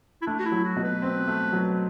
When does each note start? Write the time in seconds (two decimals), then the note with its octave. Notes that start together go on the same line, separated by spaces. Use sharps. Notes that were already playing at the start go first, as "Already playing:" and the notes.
0.22 E4
0.26 A3 D4
0.39 F#4
0.45 E4
0.52 F#3
0.64 F#4
0.76 B2
0.84 B4
1.02 C4
1.28 A3
1.53 F#3